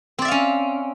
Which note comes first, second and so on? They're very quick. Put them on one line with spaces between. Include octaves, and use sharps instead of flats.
C4 D5 E5 F5 C#4